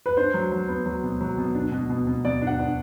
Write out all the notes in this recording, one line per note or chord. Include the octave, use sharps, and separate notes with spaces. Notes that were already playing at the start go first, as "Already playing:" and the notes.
B4
D4 C5
F#3
F#3
B3
F#3
B2
F#3
B2
D4
B2
B2
B2
B2 D5
D4
F#5
D4